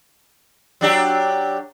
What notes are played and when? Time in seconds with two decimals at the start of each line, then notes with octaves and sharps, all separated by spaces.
0.81 F#3 D4 G4